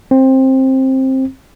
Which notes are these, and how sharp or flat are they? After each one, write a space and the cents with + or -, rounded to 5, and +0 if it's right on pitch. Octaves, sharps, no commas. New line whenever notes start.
C4 +15